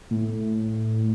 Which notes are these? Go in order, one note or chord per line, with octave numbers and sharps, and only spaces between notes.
A2